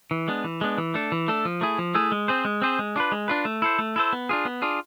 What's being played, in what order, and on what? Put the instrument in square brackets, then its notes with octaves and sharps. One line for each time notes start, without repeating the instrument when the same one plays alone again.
[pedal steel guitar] E3
G#3 B3 D4
E3
G#3 B3 D4
E3
A3 D4 A4
E3
A3 D4 A4
F3
A3 E4 G#4
F3
A3 E4 G#4
G#3
C4 G#4 C5
G#3
C4 G#4 C5
G#3
D4 F4 B4
G#3
D4 F4 B4
A3
E4 A4 C5
A3
E4 A4 C5
B3
D4 F4 G#4
B3
D4 F4 G#4